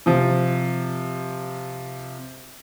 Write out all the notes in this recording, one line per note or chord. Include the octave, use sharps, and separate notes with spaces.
C3 F3